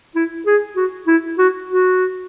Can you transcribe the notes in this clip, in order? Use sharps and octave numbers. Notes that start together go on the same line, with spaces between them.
E4
G#4
F#4
E4
F#4
F#4